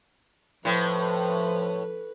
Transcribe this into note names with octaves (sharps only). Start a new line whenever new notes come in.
A2 F3 B4